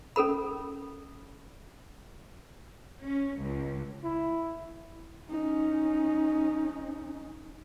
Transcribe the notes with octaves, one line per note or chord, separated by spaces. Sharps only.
C#4 A4 A#4 B5
C#4
C#2
E4
C#4 D#4